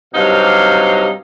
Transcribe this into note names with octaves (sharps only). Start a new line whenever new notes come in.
G2 C3 F#3 D#4 F5